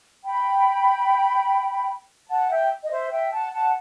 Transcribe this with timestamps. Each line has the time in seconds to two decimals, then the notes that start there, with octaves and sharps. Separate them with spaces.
0.24 G5 B5
2.29 F#5 A5
2.50 E5 G5
2.83 D#5
2.91 C5 E5
3.12 E5 G5
3.32 F#5 A5
3.53 F#5 A5